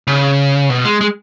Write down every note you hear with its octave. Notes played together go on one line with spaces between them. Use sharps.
C#3
B2
G#3
G#3